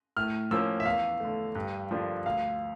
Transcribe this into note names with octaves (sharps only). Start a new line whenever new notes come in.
A2 F6
F3 A#3 C#4 E6
E5
E2 F5
D3 A3
G2
D3 F3 A#3 D4
D2 F5